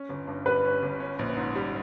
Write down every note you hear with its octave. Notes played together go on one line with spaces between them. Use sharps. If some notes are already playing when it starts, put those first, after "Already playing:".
Already playing: C#4
G1
G2
G3 B4
C#4
G1
C#4
A#1
G#2
G3